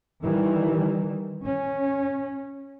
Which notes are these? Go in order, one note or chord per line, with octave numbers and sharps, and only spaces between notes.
D#3 E3 G3
C#4